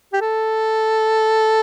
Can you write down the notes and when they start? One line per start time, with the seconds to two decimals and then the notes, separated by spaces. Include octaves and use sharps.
0.13 G4
0.21 A4